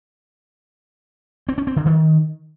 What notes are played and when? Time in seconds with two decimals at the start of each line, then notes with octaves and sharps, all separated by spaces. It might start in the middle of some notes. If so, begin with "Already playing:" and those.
1.49 C4
1.58 C#4
1.67 C4
1.76 D3
1.86 D#3